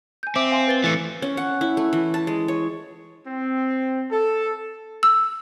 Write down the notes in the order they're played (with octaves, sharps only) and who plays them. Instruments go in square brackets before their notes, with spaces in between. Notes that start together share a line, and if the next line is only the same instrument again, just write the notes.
[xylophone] G#5 G6
[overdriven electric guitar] C4 [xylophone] E5 D6 D7
[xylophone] F5 G#5 C6
B4 A6 G7
[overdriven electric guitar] E3 A3 [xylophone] A6 C#7
[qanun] C#4
F#5
E4
A3
E3
A5
G#3
C#5
[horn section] C4
A4
[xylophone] E6